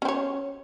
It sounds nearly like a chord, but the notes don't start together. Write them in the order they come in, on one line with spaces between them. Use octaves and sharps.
C#4 C4 C#5